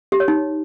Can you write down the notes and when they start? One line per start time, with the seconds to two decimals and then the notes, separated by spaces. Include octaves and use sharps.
0.12 G4
0.20 C#5
0.28 D#4